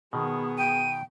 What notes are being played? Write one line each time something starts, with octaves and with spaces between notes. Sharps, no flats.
B2 D#3 B3 G#4
G5 D#7